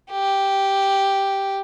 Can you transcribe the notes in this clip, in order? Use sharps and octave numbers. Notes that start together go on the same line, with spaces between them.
G4